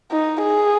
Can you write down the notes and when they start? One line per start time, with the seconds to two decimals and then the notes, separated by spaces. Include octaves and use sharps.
0.11 D#4
0.43 G#4